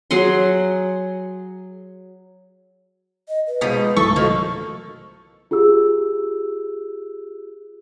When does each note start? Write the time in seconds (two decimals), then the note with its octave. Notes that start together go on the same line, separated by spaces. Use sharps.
0.11 F#3 G#4 F#5 C6
3.28 D#5
3.47 B4
3.61 B2 F3 G#3 D#4 B6
3.97 B1 E3 A3 A4 C#6
4.16 D#3 F3 A#3 F#4
5.51 F4 G4 G#4 E6